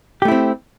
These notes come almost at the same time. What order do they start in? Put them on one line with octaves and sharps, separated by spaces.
G4 A3 E4 C4